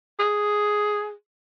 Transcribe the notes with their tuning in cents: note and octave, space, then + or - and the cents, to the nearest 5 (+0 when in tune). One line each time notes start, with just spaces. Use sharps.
G#4 +5